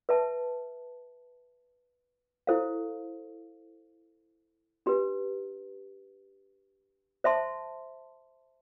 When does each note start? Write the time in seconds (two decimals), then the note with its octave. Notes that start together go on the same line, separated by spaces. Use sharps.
0.09 B4 E5 A5
2.47 E4 A4 C5 F5
4.86 D4 G4 B4
7.24 C5 E5 A5 C6